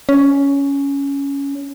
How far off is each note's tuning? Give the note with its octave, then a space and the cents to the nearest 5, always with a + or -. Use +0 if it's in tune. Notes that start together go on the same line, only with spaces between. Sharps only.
C#4 +10